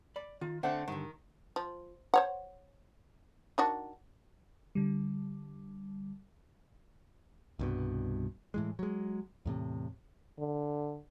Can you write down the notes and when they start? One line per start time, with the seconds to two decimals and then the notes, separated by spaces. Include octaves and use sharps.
0.16 D5 B5
0.41 D#3 F4
0.63 D3 A3 C4 D4 A4 C5 F#5
0.88 G2 D3 D#3
1.56 F3
2.14 C5 C#5 F#5
3.58 D#3 D4 F#4
4.75 D3 G3
7.59 C2 G2 B2
8.54 A2 E3 G#3
8.79 F#3 G#3
9.46 E2 A2 C3
10.39 D3